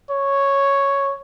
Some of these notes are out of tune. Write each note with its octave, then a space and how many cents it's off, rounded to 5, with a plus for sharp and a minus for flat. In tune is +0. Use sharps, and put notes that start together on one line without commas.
C#5 +0